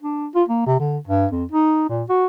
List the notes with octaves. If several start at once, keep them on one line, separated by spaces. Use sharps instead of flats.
D4
F4
A#3
C3
D3
G2
F2
D#4
A#2
F#4